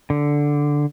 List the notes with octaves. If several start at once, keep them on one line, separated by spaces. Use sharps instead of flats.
D3